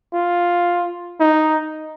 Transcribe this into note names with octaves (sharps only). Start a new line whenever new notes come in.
F4
D#4